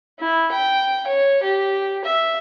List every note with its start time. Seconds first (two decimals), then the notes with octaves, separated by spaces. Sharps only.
0.19 E4
0.52 G5
1.07 C#5
1.43 G4
2.05 E5